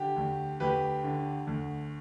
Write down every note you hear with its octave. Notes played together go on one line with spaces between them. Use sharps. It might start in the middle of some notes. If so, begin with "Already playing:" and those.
Already playing: D3 G4
D2
D2 G4 B4
D3
D2